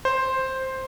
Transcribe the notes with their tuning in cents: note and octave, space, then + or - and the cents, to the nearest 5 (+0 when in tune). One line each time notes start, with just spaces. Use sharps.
C5 +5